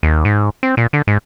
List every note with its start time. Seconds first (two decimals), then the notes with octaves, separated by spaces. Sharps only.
0.03 D#2
0.25 G#2
0.63 C4
0.77 A#2
0.93 D3
1.07 G#2